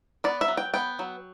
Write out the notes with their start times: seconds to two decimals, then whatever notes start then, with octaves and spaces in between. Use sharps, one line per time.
0.24 B3 D5
0.41 E5
0.48 F#3
0.57 G5
0.74 B3 G5
0.99 F#3